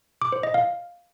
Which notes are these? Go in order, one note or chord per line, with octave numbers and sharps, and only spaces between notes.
D6
C5
D#5
F5